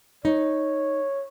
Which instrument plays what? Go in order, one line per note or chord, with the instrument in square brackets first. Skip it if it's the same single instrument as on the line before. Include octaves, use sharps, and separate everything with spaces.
[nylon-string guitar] D#4 [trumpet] C#5